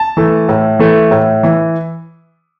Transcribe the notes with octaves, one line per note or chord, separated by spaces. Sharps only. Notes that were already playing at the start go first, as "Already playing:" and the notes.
Already playing: A5
E3 A3
A2
E3 A3
A2
E3